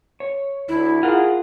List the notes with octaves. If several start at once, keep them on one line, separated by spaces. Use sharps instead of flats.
C#5
D2 E4
F4 G#4 A#4 F5 F#5